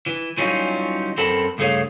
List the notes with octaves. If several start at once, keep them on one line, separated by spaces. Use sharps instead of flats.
E3
E3 F#3 G3 C#4 D#4 F4
F#2 C4 A4 A#4 A5 B5
C#2 G2 A3 G#4 C#5 F5